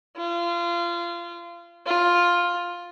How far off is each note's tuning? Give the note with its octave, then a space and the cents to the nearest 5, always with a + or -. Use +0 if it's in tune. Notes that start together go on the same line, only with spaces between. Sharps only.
F4 -25
F4 +5